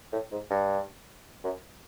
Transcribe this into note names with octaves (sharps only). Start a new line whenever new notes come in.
A2
G#2
G2
F#2